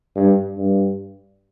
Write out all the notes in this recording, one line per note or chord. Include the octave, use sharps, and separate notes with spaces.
G2
G2